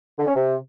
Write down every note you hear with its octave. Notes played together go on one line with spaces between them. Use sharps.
D3
C#4
C3